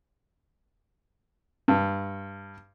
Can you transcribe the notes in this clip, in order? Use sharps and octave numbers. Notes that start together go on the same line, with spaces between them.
G2